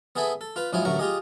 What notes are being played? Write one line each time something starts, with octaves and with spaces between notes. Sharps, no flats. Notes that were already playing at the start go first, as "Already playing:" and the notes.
B3 G#4 A4 E5 G#5 B5
A4
F4 B4
F2 G#2 F#3 E4 F4 G#5
A1 D2 F#3 A3 A#4 C#6
F4 G4 G#4 D#5